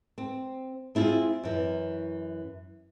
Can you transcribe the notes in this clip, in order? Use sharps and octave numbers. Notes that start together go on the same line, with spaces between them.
C4
C4 E4 F4 G#4
F#2 E3